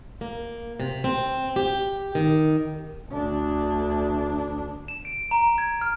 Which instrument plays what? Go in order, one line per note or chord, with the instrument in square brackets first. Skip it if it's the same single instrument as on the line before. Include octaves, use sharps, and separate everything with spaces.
[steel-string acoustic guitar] A#3
C3
C4
G4
D#3
[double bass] D2 D4
[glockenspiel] E7
D7
A#5
G#6
F6